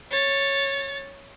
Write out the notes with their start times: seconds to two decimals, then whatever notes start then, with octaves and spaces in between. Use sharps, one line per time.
0.11 C#5 A6